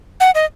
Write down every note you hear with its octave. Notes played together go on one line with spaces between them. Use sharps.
F#5
D#5